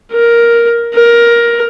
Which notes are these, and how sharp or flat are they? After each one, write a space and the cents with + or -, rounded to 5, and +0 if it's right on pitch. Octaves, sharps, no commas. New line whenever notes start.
A#4 +5
A#4 +15